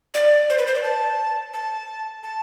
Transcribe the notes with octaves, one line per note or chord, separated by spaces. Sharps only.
D5
C5
B4
C5
D5
A5
A5
A5